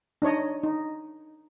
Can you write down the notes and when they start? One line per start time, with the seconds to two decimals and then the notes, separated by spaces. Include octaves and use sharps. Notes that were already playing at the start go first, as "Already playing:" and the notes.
0.22 D4 D#4 C#5 D#5
0.63 D#4